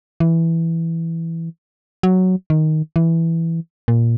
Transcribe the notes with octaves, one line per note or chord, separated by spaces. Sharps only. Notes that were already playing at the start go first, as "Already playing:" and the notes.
E3
F#3
D#3
E3
A#2